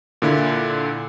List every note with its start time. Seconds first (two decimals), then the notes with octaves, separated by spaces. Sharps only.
0.22 A#2 D3 E4